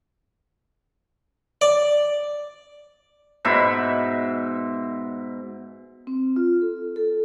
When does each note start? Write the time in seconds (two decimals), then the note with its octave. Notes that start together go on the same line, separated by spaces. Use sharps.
1.61 D5
3.45 G#2 B2 E5 B5
6.07 C4
6.36 F4
6.61 A4
6.96 A4